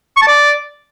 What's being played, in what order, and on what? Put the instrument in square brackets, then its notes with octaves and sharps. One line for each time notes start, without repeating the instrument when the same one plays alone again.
[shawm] C#6
A5
D5